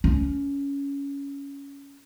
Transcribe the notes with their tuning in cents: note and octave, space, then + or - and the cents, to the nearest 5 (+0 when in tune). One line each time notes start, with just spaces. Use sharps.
C#4 +15